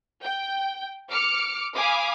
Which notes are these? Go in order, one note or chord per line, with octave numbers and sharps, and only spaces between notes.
G5
D6 F6 C#7 D7
F5 G#5 B5 D6 D#6